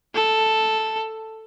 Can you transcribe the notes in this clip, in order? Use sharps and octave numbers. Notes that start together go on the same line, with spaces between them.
A4